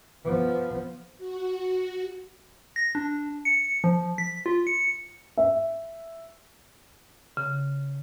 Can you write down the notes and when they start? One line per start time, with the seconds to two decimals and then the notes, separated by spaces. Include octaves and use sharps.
0.24 F3 B3
1.18 F#4
2.76 A#6
2.95 D4
3.45 C#7
3.84 F3
4.18 B6
4.46 F4
4.67 C#7
5.37 E5
7.37 C#3